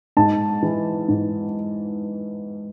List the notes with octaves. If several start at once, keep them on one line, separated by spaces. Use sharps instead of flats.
G#2 A5
E3
G#2